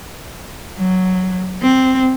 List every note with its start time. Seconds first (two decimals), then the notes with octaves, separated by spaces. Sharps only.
0.78 F#3
1.63 C4